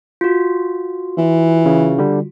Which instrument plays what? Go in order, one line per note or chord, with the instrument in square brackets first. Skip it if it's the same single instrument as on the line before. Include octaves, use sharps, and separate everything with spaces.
[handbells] F4 F#4
[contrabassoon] E3
[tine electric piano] C#3
D3 G3